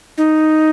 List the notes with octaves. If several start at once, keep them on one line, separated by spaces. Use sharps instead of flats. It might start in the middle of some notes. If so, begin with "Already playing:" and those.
D#4